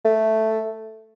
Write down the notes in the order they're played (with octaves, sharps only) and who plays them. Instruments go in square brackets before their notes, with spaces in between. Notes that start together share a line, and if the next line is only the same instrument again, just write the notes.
[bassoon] A3